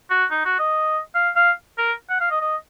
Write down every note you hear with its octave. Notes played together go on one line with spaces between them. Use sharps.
F#4
D#4
F#4
D#5
F5
F5
A#4
F#5
F5
D#5
D#5